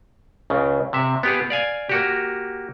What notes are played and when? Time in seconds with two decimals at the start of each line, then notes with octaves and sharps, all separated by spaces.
0.50 C#2 C#3
0.93 C3 E5
1.23 B3 G4 G#4
1.50 D5 F5 G#5
1.89 A#3 F#4 G4